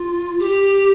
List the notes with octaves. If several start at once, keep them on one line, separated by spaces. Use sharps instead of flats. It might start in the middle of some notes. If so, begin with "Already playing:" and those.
Already playing: F4
G4